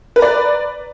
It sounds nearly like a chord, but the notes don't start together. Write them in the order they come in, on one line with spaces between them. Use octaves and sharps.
B4 A#5 D5